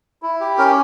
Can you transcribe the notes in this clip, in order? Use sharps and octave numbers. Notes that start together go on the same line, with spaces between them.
E4
G4
C#4 A#4